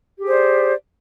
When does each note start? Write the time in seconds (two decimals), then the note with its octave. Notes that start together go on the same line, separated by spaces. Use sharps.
0.18 G4
0.22 G#4
0.27 C5
0.31 D5